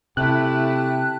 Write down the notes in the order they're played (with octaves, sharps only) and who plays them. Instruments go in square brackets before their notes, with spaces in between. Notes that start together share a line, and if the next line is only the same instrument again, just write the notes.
[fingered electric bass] C3 [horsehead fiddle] A3 E4 [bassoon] G4 [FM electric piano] F#6